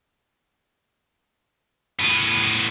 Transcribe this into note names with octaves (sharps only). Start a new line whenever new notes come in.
A2 B3